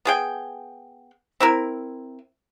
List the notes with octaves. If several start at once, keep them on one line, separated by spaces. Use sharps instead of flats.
B3 G#4 G5
C4 E4 A#4